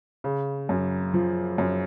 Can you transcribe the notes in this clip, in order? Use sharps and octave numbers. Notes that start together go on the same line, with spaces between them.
C#3
F#2
F3
F#2